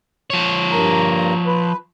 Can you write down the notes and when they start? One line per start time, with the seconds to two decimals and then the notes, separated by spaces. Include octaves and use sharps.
0.30 F3 C#5
0.71 G2 A#3 A#5
1.46 B4